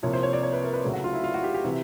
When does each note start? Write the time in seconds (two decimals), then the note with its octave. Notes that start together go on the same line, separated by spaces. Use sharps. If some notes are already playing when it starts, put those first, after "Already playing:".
0.03 C2 C3 F3 A#3 C#5
0.13 C5
0.23 C#5
0.33 D5
0.43 C#5
0.53 B4
0.63 A#4
0.73 B4
0.83 C#2 C#3 F#3 A3
0.93 F#4
1.04 F4
1.13 E4
1.24 F4
1.34 F#4
1.44 G4
1.54 G4
1.64 C3 E3